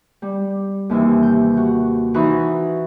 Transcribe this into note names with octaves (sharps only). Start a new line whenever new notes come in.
G3
D#2 C3 E3
G6
F#4
E3 D#4 F#4 C5 B5 C#6